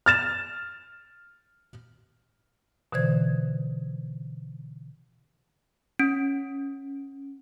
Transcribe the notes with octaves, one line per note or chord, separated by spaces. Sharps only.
F6 A6 E7
B2 D3 E3 C5 G#6
C#4